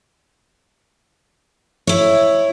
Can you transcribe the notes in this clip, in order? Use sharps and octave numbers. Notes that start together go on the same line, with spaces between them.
E4 C#5